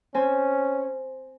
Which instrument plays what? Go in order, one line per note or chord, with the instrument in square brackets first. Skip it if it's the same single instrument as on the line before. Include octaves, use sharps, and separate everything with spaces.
[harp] C4 C5 G#5 [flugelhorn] C#4